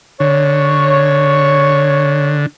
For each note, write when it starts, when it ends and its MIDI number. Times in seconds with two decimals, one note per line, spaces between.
0.20 2.46 50
0.20 2.36 73